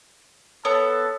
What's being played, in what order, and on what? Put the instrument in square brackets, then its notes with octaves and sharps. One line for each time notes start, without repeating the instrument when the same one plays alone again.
[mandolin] B3 [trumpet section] A4 [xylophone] C#5